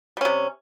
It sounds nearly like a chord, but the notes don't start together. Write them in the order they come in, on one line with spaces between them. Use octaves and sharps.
G3 C#4 C3